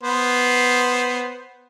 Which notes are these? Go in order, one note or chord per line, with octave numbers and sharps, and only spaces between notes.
B3 C5